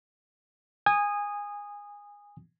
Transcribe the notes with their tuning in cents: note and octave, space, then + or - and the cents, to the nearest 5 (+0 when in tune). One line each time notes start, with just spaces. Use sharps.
G#5 -20 D#6 -10